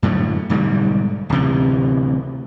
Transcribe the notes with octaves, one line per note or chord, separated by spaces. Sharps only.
F#2 A2 D3 F#3
B1 G#2 D3 G3
D1 D2 C3 E3